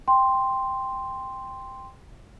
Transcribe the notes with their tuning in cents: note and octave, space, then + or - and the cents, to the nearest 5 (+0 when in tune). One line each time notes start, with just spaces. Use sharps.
G5 +10 C6 +0